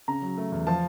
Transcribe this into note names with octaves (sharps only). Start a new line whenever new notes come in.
C#3 A#5
F#3
A3
E2
F3 A5